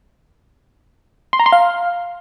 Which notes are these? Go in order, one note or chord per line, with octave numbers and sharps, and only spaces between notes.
C6
A#5
C6
F5